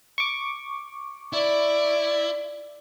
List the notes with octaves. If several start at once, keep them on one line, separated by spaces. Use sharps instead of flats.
C#6 D6
E4 D5